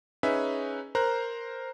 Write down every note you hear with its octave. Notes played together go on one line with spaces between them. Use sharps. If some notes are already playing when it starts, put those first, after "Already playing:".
C#4 D#4 G#4 B4 E5
A#4 C5 A#5 F#6